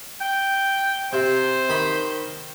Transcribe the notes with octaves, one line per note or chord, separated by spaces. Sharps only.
G5
C3 C5
D#3 B5